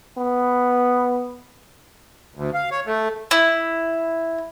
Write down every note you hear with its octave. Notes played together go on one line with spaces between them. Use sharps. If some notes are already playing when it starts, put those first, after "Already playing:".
B3
D2
F5
C#5
A3
E4